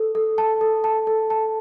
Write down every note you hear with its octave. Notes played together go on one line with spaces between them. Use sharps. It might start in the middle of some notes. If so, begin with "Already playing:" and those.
Already playing: A4
A4
A5
A4
A5
A4
A5